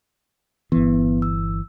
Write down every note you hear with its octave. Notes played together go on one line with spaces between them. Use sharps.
G1 E3 B3
E6